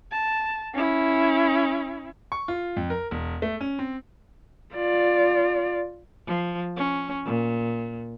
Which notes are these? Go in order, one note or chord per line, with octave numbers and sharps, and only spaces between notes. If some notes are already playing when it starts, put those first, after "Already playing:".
A5
C#4 E4
C#6
F4
F2
A#4
E1
A3
C#4
C4
F4 D5
F3
C#4
A#2